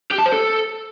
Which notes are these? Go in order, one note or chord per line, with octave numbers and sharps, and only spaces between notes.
G4
A5
C5
A4